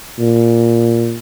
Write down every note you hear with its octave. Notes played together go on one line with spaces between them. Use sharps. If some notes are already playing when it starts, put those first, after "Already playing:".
A#2